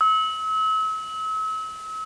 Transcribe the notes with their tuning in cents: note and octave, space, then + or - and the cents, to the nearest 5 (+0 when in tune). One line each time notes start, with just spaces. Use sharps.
E6 -40